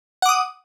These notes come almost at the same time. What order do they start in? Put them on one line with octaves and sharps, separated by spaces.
F#5 D6 D#6